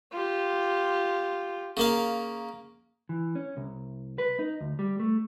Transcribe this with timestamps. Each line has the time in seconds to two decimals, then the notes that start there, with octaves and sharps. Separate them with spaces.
0.11 F4 G4
1.77 C#3 A#3 F5
3.09 E3
3.35 C#4
3.57 C2
4.18 B4
4.39 D#4
4.61 D2
4.79 G3
5.00 A3